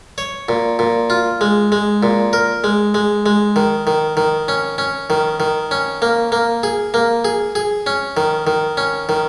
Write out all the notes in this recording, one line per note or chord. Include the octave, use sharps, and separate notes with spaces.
C#5
A#2
A#2
F4
G#3
G#3
A#2
A#4
G#3
G#3
G#3
D#3
D#3
D#3
C#4
C#4
D#3
D#3
C#4
A#3
A#3
G#4
A#3
G#4
G#4
C#4
D#3
D#3
C#4
D#3